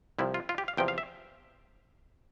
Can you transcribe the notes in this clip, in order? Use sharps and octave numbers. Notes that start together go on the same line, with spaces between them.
C2 C3 F3 E4
F4
F4
G4
F5
E2 C3 F3 G5
F5
E5